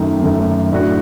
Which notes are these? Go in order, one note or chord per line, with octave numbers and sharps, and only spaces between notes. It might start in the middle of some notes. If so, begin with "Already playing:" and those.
Already playing: F#2 D#3 A3
F#2 D#3 A3
A2 A3 D4 F#4